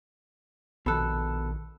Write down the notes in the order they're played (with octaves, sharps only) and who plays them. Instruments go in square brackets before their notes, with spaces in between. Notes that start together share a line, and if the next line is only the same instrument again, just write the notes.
[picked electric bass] A#1 D#3 [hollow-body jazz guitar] B2 A4 [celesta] B5 E6 F#6